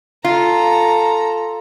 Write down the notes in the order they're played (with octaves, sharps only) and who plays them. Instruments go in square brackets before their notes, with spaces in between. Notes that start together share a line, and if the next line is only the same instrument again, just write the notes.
[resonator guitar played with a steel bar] F4 [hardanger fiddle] A4 A#5